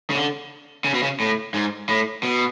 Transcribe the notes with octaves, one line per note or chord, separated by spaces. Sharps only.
C#3
D3
C#3
B2
C#3
A2
G#2
A2
B2